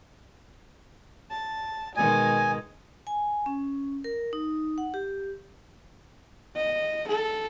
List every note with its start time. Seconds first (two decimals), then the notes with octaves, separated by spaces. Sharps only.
1.31 A5
1.96 B2 D#3 G#3 D#5 G#5
3.07 G#5
3.46 C#4
4.04 A#4
4.33 D#4
4.78 F#5
4.94 G4
6.56 D#5
7.08 A4